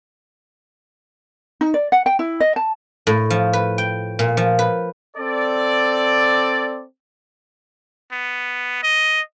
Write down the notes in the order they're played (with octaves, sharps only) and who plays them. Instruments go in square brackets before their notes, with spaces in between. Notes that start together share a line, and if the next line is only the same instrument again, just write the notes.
[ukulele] D#4
D5
F#5
G5
E4
D#5
A5
[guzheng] A2
F3
B4
G5
A#2
F3
B4
[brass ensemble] C4 A4 D5
[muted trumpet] B3
D#5